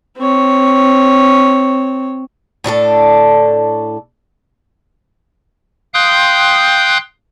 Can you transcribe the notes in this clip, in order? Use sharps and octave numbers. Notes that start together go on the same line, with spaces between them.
C4 C#5
A2 D4 F#4 A4
F5 G5 C6 D#6 F#6 G6